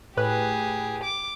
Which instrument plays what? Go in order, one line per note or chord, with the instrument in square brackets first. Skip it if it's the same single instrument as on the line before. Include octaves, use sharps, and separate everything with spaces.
[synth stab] A2 B4 F#6 [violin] G4 G#4
[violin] D6